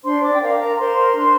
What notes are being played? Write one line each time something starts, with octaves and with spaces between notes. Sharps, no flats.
D4 C5 C6
D5 D6
G5
A#4 F5
A#4 A#5
A#4 C5 C6
D4